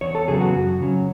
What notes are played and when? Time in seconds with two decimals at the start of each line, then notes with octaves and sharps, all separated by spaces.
0.01 E2 C#5
0.15 A4
0.28 C#3 F#3 B3 G#4
0.41 F#4
0.54 F#2
0.80 C#3 F#3 C#4